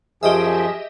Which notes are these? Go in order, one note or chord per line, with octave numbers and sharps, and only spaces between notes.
F#2 F3 G4 G#4 D#5 E5